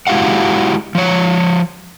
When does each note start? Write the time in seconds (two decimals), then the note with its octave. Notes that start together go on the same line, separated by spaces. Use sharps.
0.07 G#3 E4 F#4 G4 F5 F#5
0.95 F3 C#5